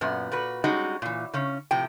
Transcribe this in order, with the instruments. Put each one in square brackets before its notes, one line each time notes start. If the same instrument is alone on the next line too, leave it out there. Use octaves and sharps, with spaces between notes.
[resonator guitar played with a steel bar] F#2 A#2 B3
A#2 F#4 B4
G3 G#3 C#4 D#4 F#4
A#2 E3
C#3 C#4
A2 C3 F3 G5